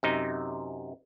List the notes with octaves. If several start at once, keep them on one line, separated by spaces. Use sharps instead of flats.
F#2 C3 D#4